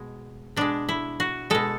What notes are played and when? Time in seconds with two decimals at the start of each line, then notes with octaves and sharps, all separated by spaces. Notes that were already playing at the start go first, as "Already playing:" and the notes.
Already playing: B2 G#3
0.56 B2 G#3 D4
0.89 E4
1.20 F#4
1.50 B2 G#3 A4